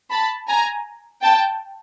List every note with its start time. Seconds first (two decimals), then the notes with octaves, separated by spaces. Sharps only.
0.11 A5 B5
0.48 G#5 A#5
1.23 G5 A5